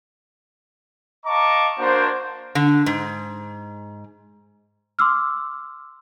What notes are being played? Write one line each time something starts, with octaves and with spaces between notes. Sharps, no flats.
D#5 F5 A5 A#5 C#6 D6
A#3 D4 F#4 C5
D3
G#2
C6 D6 E6 F6